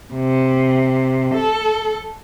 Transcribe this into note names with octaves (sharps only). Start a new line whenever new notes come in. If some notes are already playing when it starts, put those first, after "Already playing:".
C3
A4